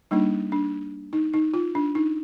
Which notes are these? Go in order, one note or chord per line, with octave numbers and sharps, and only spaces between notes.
G3 A#3 D4 D#4
D4
D#4
D#4
F4
D4
D#4